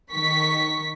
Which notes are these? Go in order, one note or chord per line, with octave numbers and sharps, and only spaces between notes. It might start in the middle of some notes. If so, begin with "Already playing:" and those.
D#3 C#6 B6